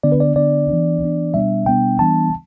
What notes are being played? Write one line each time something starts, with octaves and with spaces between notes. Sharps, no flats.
D3 B3 D4 D5
B4
D5
D3 B3 D4 D5
E3 B3 D4
E3 B3 D4
B2 G3 B3 D4 E5
B2 G3 B3 D4 G5
E3 G3 B3 D4 A5